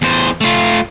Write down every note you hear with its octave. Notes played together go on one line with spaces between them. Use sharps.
E2 C5
A3 F4